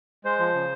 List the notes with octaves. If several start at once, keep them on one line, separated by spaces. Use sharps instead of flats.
G#3 C5
F3
C#3